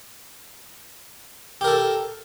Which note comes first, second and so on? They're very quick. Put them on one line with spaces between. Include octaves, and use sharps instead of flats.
G4 A#4 A4